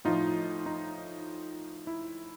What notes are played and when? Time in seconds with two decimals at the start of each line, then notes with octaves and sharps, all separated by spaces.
0.05 A2 F3 D#4 F4
0.66 D#4
1.87 E4